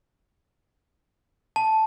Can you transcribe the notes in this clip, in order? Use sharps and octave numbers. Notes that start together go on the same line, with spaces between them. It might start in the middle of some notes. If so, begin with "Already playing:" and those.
A5